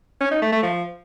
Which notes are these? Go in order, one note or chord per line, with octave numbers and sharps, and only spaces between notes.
C#4
D#4
A3
A3
F3